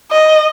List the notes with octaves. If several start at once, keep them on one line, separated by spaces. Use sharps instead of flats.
D#5